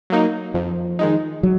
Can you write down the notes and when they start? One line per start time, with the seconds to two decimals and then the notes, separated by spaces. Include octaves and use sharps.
0.10 F#3 A#3 D#4
0.54 F2 F3
0.99 D#3 G#3 D#4
1.43 F#3